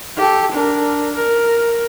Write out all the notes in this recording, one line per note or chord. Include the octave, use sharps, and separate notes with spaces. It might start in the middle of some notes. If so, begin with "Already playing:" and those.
G4 A4
D4 A#4
A#4